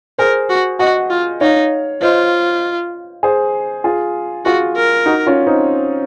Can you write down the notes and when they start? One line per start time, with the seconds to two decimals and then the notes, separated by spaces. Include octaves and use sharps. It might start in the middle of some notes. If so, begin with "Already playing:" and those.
0.18 G#4 A#4 C5
0.49 F#4
0.79 F#4 D#5 F#5
1.10 F4
1.41 D#4 C#5 F5
2.02 F4 C5 D#5
3.23 G#4 C5
3.84 F4 G#4
4.45 F4 F#4 G#4
4.76 A#4
5.06 D#4 F#4
5.26 C#4 F4
5.47 C4 D#4